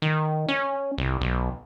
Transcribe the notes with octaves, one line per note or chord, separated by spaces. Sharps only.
D#3
C#4
C2
B1